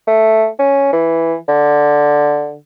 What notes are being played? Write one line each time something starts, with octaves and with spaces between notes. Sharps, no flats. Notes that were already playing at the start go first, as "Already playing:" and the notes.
A3
C#4
E3
D3